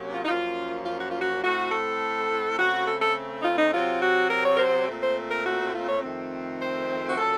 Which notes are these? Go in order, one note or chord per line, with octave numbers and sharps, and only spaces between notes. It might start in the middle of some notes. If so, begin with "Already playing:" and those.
Already playing: C3 F#3 A#3 C#4
F4
D#4
F#2 F3 A#3 C#4 F4
F4
F#4
F4
F#4
A2 A3 C4 F#4
A4
C#3 A3 C4 F#4
A4
A4
D#4
F4
D#4
C3 F#3 C4 F4
F#4
A#4
C#5
A#4
C5
A#2 A3 C4
C5
A#4
F#4
F4
C#5
F2 D#3 A3 C4
C5
F#4
A#2 F#3 A#3 C#4 A4